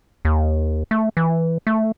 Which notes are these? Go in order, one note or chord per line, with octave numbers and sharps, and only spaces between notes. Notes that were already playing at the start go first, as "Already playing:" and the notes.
D#2
A3
E3
A3